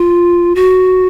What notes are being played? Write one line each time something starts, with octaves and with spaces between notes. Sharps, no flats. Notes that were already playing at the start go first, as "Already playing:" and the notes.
Already playing: F4
F#4